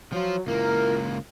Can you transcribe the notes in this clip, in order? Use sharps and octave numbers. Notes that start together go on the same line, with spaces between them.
F3 F#3 F4
C#2 A#3 E4 F4 A#4